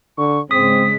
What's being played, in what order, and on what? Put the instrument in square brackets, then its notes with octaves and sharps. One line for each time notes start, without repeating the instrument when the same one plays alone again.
[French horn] D3 [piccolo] C#6
[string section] G#2 C#3 G#3 [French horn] C4 [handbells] D#6 [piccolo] B6